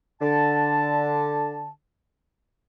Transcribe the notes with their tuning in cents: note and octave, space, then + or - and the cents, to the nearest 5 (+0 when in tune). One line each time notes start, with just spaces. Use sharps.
D3 +0 A5 +0